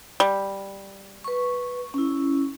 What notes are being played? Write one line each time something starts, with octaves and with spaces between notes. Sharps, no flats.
G3
B4 C#6
C#4 E4